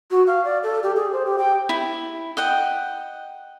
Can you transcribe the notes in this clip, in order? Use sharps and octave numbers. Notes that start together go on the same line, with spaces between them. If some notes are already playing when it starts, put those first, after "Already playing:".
F#4
F5
D5
A4
G4
G#4
C5
G4
G5
E4
D#5 F#5 G5